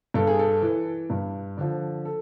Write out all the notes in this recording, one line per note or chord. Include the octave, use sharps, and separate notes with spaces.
G2 A4
G#4
A4
E3
G2
D3 F3
A4